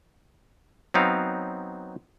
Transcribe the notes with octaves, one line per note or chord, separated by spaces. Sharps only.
F#3 B3 C4 D#4 F5